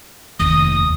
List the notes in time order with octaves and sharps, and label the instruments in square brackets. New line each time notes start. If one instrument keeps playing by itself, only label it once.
[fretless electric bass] F1 D#2 [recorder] D#6